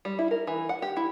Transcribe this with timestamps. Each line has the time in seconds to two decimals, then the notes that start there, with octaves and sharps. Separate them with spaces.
0.05 G3
0.19 E4
0.31 A#4
0.47 E3
0.69 F#5
0.82 G4
0.97 E4